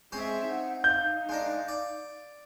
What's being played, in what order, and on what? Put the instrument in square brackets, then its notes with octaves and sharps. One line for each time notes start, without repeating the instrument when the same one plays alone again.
[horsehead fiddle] G#3 E5 [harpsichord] C4 C#4 C5
[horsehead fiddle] D#4 [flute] F#5
[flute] F5 [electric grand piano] G6
[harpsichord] G#3 D4 A#4
D5